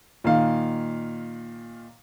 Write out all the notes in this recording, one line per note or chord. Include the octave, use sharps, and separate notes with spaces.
A#2 D#3 F5